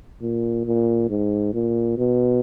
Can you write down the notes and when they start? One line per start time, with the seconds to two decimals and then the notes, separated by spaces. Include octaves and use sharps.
0.21 A#2
0.65 A#2
1.09 G#2
1.54 A#2
1.98 B2